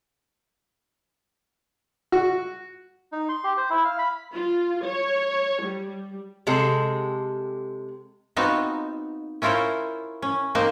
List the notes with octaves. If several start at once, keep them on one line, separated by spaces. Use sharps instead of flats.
F#4
D#4
C6
G4
C5
E4
F5
B5
F4
C#5
G3
C3 G#3 A4
B3 C4 D#4 F4 F#4
C#4 E4 F4 A#4 C5 C#5
C#4
A#3 C4 D#4 C5